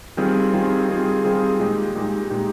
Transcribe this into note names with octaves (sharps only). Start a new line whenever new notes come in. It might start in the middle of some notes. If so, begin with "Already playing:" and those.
D#3 G3 C4 F4 G#4
D#3 G3 C4 F4 G#4
D#3 G3 C4 F4 G#4
D#3 G3 C4 F4 G#4
A#2 G#3 D#4 G4
A#2 G#3 D#4 G4
A#2 G#3 D#4 G4